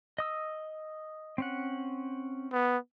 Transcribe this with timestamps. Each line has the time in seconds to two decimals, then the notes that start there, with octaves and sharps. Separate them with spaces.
0.18 D#5 D#6 E6
1.38 C4 C#4 F#5
2.52 B3